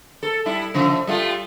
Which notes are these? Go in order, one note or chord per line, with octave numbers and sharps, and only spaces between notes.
A4
G3 E4
C#3 F3 A3
G3 A3 F4